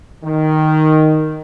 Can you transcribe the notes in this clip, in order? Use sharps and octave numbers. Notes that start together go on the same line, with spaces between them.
D#3